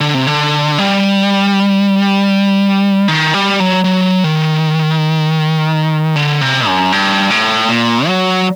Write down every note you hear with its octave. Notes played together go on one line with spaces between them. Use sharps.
D3
C3
D3
G3
D#3
G3
F#3
F#3
D#3
D3
C3
F#2
G2
A2
A#2
F#3